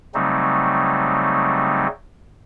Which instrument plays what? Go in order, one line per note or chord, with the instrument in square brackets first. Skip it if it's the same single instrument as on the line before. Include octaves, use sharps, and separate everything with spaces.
[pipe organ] C#3 F#3 G3 A3 C4 D#4